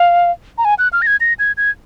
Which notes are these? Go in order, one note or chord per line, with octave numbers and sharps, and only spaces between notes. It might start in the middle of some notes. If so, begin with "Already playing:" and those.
Already playing: F5
A#5
G#5
F#6
F6
A#6
G#6
A#6
G#6
G#6